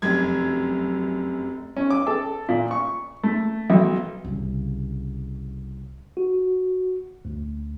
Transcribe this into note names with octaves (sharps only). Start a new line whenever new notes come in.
F1 F#2 G#6
C#4
D6
A4
A#2
C#6
A3
B1
C2 C#3
F#4
D2